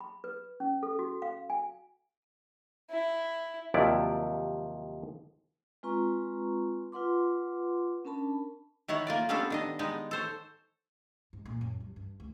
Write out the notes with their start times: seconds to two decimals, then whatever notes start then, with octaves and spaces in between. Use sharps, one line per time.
0.01 B5
0.24 B4
0.60 C#4
0.83 A4
0.99 F#4
1.22 F5
1.50 G#5
2.91 E4
3.74 D#2 C3 F3 F#3 E4 D5
5.83 G#3 C4 F4 B4 A#5 C#6
6.92 F4 B4 F#5 C6 D6
8.05 C#4 D4 A#4 A5 B5
8.88 D#3 E4 C#5 F#5
9.07 A#3 F4 D5
9.29 G3 B3 C#4 D4 A4
9.50 D#3 D4 D#5
9.79 G3 G#3 B3 D#4
10.11 A4 C5 C#5
11.33 G#2
11.46 A#2
11.61 F#2
11.80 G3
11.96 G2
12.20 D2